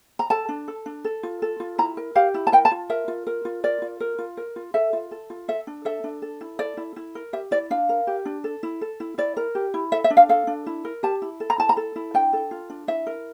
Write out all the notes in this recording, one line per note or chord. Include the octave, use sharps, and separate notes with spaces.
A#5
A4 A5
D4
A4
D4
A4
F4
A4
F4
E4 A#5
A#4
G4 F5
E4
A5
A#4 G5
A5
F4
A#4 E5
F4
A#4
F4
A#4 D5
F4
A#4
F4
A#4
F4
A4 E5
F4
A4
F4
A4 E5
D4
A4 E5
D4
A4
E4
A4 D5
E4
E4
A#4
G4 E5
E4 D5
D4 F5
A#4
G4
D4
A4
E4
A4
E4
E4 D5
A#4
G4
E4
A4 E5
E5
D4
F5
A4 F5
D4
E4
A#4
G4 A5
E4
A4
A#5
E4 A5
A#5
A4
E4
D4 G5
A4
F4
D4
E4 E5
A#4